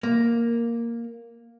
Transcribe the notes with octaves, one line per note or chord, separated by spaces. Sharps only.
A#3